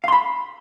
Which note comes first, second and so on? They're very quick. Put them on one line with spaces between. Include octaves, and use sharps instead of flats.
F5 C6 B5